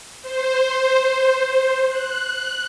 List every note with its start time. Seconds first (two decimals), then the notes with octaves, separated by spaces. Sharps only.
0.22 C5
1.88 F#6